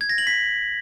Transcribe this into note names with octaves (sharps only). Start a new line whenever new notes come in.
G#6
A#6
F#7
B6